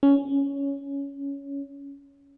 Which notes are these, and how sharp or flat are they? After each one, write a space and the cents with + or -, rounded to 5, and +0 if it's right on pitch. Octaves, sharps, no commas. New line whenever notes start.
C#4 +10